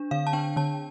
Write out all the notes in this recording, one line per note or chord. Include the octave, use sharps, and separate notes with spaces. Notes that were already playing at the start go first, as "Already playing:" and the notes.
Already playing: D4
D3 F5
A5
D4 G5
D3 A5